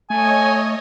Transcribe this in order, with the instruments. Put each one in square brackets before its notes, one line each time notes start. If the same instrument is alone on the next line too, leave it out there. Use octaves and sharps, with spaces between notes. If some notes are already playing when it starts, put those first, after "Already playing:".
[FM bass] A3 [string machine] C#5 D#5 [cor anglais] G#5